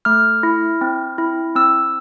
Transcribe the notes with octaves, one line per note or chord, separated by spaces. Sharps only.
A3 F6
E4
C4
E4
C4 E6